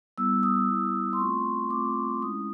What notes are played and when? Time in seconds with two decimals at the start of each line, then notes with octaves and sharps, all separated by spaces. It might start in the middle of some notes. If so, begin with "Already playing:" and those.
0.18 G3 B3 E4 E6
0.43 D#6
0.69 G3 B3 E4
1.13 C6
1.19 A3 C4 F4 C#6
1.70 A3 C4 F4 D6
2.22 G#3 C#4 E4 D#6